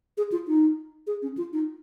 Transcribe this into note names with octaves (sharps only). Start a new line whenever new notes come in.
G#4
F4
D#4
G#4
C#4
F4
D#4